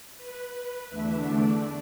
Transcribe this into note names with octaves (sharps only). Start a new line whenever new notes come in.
B4
B4
E2 D3 A3 D4 E5
D5